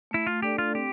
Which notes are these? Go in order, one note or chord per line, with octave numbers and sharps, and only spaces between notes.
A3 E4
F4
D4 G4 A4 D5
F4
C4 G4